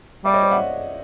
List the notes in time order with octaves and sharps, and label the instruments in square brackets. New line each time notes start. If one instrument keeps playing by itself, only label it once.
[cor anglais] G3 [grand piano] D5 E5
[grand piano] C#5 D#5
C5 D5
E5 F#5